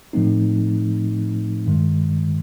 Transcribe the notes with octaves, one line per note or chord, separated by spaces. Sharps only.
A2 F3 A3 C4 D#4
G2 D#3 G#3